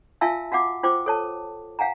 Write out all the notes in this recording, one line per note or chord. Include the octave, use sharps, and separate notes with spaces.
F4 E5 F5 G#5 A5 E6
F#4 F5 F#5 D6
F4 C5 G5 D6
A4 C#5 A5
F5 F#5 G#5 A#5